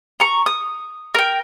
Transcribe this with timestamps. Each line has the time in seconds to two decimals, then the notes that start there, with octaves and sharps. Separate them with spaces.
0.20 A#5 C#6
0.46 D#6
1.15 A#4 G5